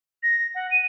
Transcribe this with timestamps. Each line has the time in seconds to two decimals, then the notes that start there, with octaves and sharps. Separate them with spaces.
0.23 A#6
0.55 F#5
0.71 D#7